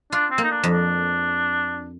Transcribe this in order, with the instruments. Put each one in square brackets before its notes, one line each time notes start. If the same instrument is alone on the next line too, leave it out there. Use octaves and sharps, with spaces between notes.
[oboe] D4 [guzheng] F4
[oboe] C4
[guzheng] A#3
[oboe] D#4
D4
[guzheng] F2
[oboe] D4